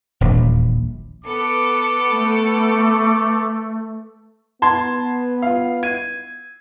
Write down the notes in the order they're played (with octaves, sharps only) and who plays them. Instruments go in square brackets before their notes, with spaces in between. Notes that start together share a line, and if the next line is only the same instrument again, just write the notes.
[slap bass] D#1 A#1 E2
[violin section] B3 A4 C#7 [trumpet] D6
[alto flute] A3
[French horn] B3 [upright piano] A5 C6 G#6
[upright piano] F4 F5
G#6 D#7